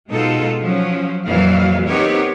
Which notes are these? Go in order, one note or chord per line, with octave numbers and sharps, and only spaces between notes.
B2 G#3 D#4 F4 A4
F3 F#3 C#4
F2 A#2 E3 F#3 G3 F5
B3 C4 D#4 G4 A#4 C#5